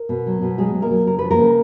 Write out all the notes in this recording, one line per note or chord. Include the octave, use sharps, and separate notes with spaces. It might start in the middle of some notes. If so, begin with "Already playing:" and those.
Already playing: A#4
B2
F#3
B2
F#3 G#3 G#4
B2
A#3 A#4
F#3
C#3 A#4
F3 B4
A#3 A#4
C#3